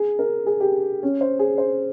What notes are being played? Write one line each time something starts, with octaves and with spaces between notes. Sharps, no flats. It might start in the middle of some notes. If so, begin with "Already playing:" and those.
Already playing: G#4
A#4
G#4
G4
C#4
C5
G#4
C5